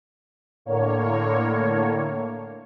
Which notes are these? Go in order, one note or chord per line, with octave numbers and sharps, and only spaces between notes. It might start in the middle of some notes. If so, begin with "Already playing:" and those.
A2 D3 A#3 C#5